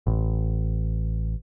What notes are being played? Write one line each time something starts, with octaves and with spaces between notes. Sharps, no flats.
A1